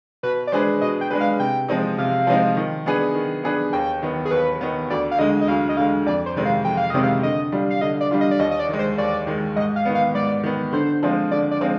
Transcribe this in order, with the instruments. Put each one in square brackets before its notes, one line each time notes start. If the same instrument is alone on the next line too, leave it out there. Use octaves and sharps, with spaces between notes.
[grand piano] B2 [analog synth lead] B4
[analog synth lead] D5
[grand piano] G#3 D4 G#4 B4 [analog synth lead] C5
[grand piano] B2 [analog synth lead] D#5
[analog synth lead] G5
[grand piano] G#3 D4 G#4 B4
[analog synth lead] F5
[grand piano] C3 [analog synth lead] G5
[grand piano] F3 G#3 C4 D#4
[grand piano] C3 [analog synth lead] F5
[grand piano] F3 G#3 C4 D#4
D#3
B3 D4 G#4 B4
D#3
B3 D4 G#4 B4
[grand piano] D#2 [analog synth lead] G5
[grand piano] D#3 B3
[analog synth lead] G#4
[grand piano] D#2 [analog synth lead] B4
[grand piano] D#3 B3
[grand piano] D2 [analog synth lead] D5
[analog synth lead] F5
[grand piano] D3 G#3 [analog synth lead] D#5
[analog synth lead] D#5
[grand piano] D2 [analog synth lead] F5
[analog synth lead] D#5
[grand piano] D3 G#3 [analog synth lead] F5
[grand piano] F2 [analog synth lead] D5
[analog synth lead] C5
[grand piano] C3 D#3 G#3 C4
[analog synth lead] F5
[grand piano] F2 [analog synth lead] G5
[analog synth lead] F5
[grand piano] C3 D#3 G#3 C4 [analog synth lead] D#5
[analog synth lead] F5
[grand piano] D3 [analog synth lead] D#5
[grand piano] G3 D4 F4
[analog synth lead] F5
[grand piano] D3 [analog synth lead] D#5
[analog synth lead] D5
[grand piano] G3 D4 F4
[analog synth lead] D#5
D5
[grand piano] D#2 [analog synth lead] D#5
[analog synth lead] D#5
D5
[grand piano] D#3 G#3
[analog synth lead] C5
[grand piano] D#2 [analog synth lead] D5
[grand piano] D#3 G#3
[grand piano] G#2 [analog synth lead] D#5
[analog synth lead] F5
[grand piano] D#3 B3
[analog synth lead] F5
[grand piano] G#2 [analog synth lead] D5
[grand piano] D#3 B3
[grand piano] D3 [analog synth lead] C5
[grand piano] F3 G#3 C4 F4
[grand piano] D3 [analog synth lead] D5
[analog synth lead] D5
[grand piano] F3 G#3 C4 F4